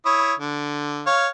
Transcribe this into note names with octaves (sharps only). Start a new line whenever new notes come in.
E4 C#5 D#6
D3
C#5 F5